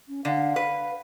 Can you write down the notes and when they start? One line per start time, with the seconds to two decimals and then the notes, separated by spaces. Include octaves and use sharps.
0.08 C#4
0.25 D3 F5
0.56 B4